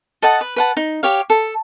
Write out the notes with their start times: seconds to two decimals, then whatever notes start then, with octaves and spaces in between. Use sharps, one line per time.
0.22 A4 D#5 F#5 A5
0.41 B4
0.56 B4 F#5 A5
0.77 D#4
1.03 G4 C#5 F5
1.30 A4